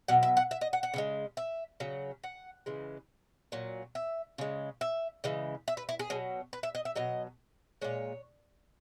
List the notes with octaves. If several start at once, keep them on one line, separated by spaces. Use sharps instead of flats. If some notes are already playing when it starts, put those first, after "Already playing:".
B2 F#3 F#5
E5
F#5
E5
D#5
F#5
F#5
C#3 E3 G#3
E5
C#3 F#3
F#5
C#3 E3 G#3
A#2 F#3
E5
C#3 G#3
E5
C#3 E3 G#3
E5
B4
E4
G#4
B2 F#3
B4
E5
D#5
E5
B2 F#3 D#5
A#2 G#3 C#5